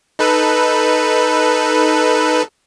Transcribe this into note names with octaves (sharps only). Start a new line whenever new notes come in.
D#4 A4 B4